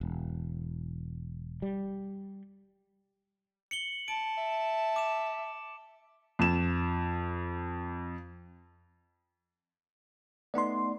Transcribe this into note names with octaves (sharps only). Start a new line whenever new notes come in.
E1
G3
C#7 F#7 G7
A5 D7
E5
D6 E7
F2 E7
A3 B3 D#4 D5 C6